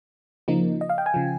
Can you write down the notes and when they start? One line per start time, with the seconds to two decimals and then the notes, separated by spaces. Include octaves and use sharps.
0.48 C#3 F3 A#3 D#4
0.81 D#5
0.89 F5
0.98 G5
1.06 G#5
1.14 C#3 F3